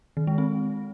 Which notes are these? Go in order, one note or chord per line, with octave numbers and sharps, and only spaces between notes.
D#3
G#3
C4